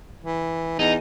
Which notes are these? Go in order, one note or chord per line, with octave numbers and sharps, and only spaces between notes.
E3
E2 D#4